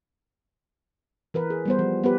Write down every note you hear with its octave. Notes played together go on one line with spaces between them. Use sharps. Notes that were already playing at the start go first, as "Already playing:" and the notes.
E3 A#4 B4
G#4
G3 B3 C5
F3
B3 G4 B4